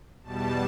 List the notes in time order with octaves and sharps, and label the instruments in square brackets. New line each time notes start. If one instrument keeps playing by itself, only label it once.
[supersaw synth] E2 B2 G3 A5